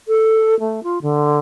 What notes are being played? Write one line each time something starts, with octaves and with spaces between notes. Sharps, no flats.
A4
A3
F4
D3